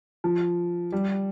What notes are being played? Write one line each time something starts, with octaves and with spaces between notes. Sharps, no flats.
F3
G3